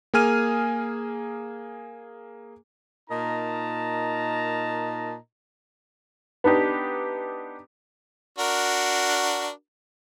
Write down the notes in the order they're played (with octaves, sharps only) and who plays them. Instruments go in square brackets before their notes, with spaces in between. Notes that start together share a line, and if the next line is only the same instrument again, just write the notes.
[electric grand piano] A#3 G#4 G#5 F6 D#7
[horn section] A#2 D#4 A#4 D#5 A5 A#5
[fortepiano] B3 D4 D#4 G4
[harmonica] D4 F#4 A#4